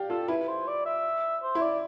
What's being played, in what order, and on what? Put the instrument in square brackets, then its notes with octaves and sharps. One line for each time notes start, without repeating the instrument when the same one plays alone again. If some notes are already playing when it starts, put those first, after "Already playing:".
Already playing: [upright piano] G4 D5 F5
[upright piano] F4 [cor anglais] A4
[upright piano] E4 [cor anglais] B4
[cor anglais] C5
D5
E5
C5
[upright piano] E4
[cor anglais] D5